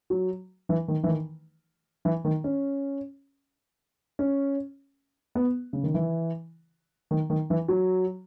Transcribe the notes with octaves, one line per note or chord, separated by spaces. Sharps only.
F#3
E3
D#3
E3
D#3
E3
D#3
C#4
C#4
B3
C#3
D#3
E3
D#3
D#3
E3
F#3